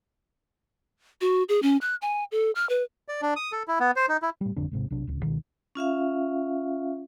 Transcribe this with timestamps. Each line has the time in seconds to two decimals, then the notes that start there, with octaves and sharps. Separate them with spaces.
1.21 F#4
1.49 G#4
1.63 C#4
1.81 F#6
2.02 G#5
2.32 A4
2.55 F6
2.69 B4
3.08 D5
3.22 D4
3.36 D#6
3.52 A4
3.68 E4
3.80 B3
3.96 C5
4.09 D#4
4.22 E4
4.41 A2 G3
4.56 G#1 F2 D3 D4
4.71 G#1 G#2 C3
4.90 B1 C3 D4
5.07 D1 C#2
5.23 C#2 B2 D#3
5.75 C#4 F4 E5 F5